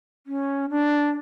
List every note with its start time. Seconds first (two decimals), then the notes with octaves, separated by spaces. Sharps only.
0.27 C#4
0.70 D4